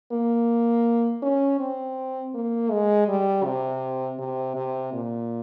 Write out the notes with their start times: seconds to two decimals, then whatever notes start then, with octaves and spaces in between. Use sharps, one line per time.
0.12 A#3
1.22 C#4
1.59 C4
2.34 A#3
2.71 G#3
3.08 G3
3.45 C3
4.19 C3
4.56 C3
4.93 A#2